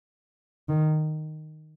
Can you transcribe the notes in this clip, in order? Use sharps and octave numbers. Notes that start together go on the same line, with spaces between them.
D#3